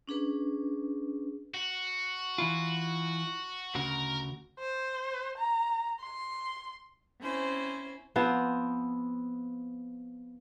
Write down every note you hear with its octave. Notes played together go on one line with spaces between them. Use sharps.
C#4 D4 G#4 B4
F#4
E3 E4 F4
D2 C#3 F#4 A#4
C5
A#5
C6
C4 C#4 E4 C5
F3 B3 C4 C5